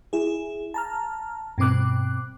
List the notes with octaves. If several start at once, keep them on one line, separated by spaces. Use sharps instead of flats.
E4 G#4
A5 A#5 F6
G2 B2 C4 D6 F#6